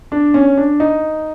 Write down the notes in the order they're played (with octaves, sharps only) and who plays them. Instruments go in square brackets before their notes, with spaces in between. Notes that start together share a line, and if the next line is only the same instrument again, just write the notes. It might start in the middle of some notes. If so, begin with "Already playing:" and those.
[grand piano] D4
C#4
D4
D#4